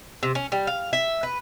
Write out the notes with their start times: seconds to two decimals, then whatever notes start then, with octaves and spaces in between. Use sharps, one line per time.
0.23 C3
0.35 C#4
0.52 G3
0.67 F5
0.93 E5
1.23 B4